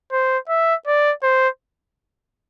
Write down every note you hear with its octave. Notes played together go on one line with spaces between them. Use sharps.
C5
E5
D5
C5